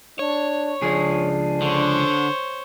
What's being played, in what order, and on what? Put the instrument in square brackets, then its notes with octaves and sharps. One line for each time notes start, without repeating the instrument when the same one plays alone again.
[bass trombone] D4 [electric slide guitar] C#5
[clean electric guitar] C#2 F3 G#4 [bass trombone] D4
[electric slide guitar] D3 [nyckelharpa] C5 C#5